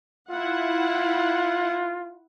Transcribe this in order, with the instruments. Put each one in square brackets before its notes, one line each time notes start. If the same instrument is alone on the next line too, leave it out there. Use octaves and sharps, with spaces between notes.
[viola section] E4 F#5 [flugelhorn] F4